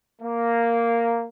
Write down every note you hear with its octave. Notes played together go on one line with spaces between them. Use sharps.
A#3